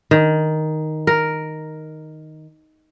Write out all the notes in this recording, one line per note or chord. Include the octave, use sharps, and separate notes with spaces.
D#3
A#4